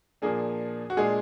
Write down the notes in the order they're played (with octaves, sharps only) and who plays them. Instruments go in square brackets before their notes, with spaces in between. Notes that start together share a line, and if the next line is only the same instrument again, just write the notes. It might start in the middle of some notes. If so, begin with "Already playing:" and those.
[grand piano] A#2 F3 A#3 D4 [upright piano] G#4
[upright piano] F#4
[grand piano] A#2 G#3 D4 [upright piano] G#4